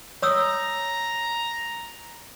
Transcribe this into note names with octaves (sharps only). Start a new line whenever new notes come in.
C#5 A#5 D#6 E6